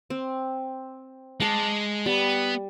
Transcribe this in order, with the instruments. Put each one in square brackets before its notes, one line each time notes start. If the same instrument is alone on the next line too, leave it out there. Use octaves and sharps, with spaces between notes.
[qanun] C4
[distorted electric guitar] G#3 [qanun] A5 D6
[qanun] G3 [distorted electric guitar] B3